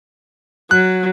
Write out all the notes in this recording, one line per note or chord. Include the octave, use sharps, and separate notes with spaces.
F#3 F#6